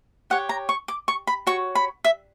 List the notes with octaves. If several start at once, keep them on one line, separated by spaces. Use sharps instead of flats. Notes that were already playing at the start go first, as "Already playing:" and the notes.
G4 C#5 F#5
A#5
C#6
D6
C#6
B5
F#4 C#5 C#6
B5
E5